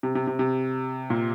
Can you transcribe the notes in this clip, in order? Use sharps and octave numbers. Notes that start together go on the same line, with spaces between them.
C3
C3
C3
C3
A#2